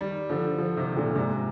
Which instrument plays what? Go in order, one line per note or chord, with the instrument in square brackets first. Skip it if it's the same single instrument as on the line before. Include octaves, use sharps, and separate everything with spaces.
[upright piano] D#3 G3
D3 F3
D3 F3
C3 D#3
A#2 D3
G#2 C3